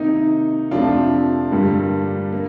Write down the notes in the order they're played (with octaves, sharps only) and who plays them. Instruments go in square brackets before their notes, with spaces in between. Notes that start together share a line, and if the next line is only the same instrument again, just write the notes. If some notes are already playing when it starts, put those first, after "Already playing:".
Already playing: [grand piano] C3 D#3 A#3 D#4
F2 C3 F3 A3 D4 F4
G2 D3 G3 A#3
A#3